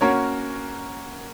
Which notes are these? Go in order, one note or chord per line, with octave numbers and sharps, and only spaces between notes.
A#3 C#4 F#4 A#4 C#5